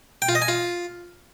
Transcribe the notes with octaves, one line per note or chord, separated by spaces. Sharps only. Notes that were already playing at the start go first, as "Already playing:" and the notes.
G5
F4
D#5
G#5
F4